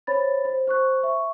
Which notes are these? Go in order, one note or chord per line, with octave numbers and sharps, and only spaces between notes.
C5 C#5 B5 A6
C5
C5 C#6 F#6
E5 C#6